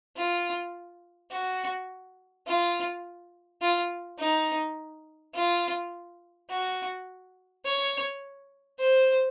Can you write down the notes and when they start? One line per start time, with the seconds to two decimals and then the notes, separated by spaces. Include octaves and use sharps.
0.17 F4
1.31 F#4
2.47 F4
3.62 F4
4.19 D#4
5.34 F4
6.50 F#4
7.64 C#5
8.79 C5